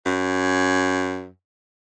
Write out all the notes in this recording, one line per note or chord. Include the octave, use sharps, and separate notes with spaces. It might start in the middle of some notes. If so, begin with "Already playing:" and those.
F#2